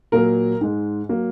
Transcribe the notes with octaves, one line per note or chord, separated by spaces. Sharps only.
A#2 F#3 A#3 A#4
G#2 G#3
F#3 A#3